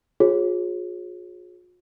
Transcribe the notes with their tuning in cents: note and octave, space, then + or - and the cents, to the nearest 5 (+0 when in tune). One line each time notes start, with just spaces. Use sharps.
F4 +45 G#4 +0 C#5 -30